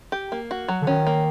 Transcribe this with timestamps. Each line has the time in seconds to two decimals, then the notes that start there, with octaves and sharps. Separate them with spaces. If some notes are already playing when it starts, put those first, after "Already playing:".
0.12 G4
0.32 A#3
0.51 F#4
0.68 F#3
0.82 D3
0.87 D#3 C#4
1.07 A#3